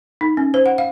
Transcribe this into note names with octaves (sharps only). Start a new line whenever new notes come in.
D#4
C#4
C5
F#5
F5